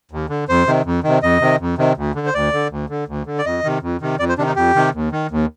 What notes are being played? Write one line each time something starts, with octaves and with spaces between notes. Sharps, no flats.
D#2
D3
F2 C5
C3 D#3
F2
C3 D#3
F2 D#5
C3 D#3
F2
C3 D#3
D2
D3
C5
D2 D5
D3
D2
D3
D2
D3
D5
F2 D#5
C3 D#3
F2
C3 D#3
F2 D5
C5
C3 D#3 D4
D#4
F2 G4
C3 D#3
D#2
D#3
D#2